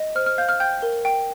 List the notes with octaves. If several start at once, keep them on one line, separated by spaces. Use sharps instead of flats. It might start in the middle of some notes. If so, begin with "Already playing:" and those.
Already playing: D#5
C5 F6
F6
F5 G6
F6
G5 G6
A#4
G5